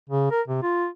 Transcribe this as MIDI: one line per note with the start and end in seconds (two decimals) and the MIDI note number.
0.10 0.27 49
0.31 0.41 70
0.48 0.63 48
0.63 0.87 65